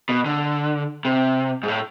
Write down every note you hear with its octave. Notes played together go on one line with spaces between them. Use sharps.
B2
D3
C3
G#2
A2